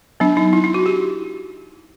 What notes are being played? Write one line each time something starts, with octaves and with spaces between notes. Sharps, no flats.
F#3 B3 D4
D#4
E4
E4
F#4
G4